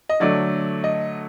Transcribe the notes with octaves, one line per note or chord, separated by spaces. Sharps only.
D#5
D3 F#3 A3 D5
D#5